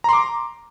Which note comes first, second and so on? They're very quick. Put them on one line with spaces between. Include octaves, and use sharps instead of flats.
A#5 C6 D6